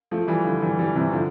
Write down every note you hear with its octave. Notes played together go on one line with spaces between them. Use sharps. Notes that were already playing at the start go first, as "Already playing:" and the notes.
F3 A3
E3 G3
D3 F3
E3 G3
E3 G3
C3 E3
D3 F3